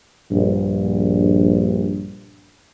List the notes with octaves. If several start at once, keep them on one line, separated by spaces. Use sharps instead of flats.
A#1 G2